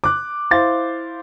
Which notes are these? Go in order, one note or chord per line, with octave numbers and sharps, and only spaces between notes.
D6 F#6
E4 C5 F5 C6 A6